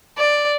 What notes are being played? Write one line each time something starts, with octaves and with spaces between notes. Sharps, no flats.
D5